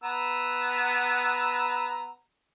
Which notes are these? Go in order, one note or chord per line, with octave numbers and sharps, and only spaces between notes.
B3 A#5 E6